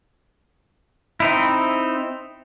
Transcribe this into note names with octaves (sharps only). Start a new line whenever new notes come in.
C4 D#4 E4